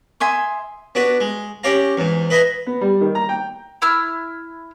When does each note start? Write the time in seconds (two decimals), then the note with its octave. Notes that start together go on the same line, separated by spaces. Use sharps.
0.20 E5 G#5 C6 D#6
0.95 B3 D4 F#4 B4
1.20 G#3
1.63 C#4 G4 C#5 D5 F5 A#5
1.97 E2 G#2
2.30 B4 D#5 E5 G#5 A#5 B5
2.67 B3
2.81 G3
3.01 D#3
3.15 A#5
3.29 G5
3.82 E4 E6 F6